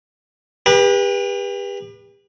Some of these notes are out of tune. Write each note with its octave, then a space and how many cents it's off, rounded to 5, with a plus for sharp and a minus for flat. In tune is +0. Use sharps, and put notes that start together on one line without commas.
G4 +35 B4 -25